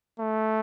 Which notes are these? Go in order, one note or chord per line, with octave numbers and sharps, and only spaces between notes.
A3